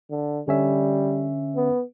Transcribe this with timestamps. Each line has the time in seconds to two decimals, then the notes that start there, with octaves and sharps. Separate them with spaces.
0.10 D3
0.48 D3 G3 C#4 E5
1.56 B3